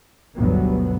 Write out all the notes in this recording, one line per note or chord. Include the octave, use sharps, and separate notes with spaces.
G1 D2 G2 B2 F#3 B3